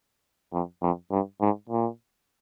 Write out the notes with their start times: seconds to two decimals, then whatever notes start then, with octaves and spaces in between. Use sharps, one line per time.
0.52 F2
0.82 F2
1.11 G2
1.41 G#2
1.69 A#2